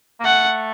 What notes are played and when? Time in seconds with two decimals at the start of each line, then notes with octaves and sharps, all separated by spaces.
0.20 A#3
0.25 A3 F#5